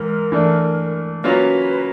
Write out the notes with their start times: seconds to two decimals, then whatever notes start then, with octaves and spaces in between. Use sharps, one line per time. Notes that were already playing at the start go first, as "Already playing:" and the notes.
Already playing: G#2 E3 A#4
0.32 E3 A3 D4
1.24 F#3 A#3 C#4 F4 B4